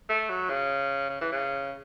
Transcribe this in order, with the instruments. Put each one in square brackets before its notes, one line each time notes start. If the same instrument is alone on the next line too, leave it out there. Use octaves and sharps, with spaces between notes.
[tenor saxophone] A3
F#3
C#3
C#3
E3
C#3